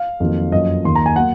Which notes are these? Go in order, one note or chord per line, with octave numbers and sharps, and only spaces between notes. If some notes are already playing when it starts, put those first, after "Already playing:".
Already playing: F5
F2 D#3 F#3 A#3
F#2 F3 A#3 D#5
D#2 D#3 A#3 C6
A#5
G#5
F#3 A#3 F#5